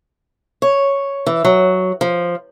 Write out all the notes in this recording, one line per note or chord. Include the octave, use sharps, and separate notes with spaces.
C#5
E3
F#3
F3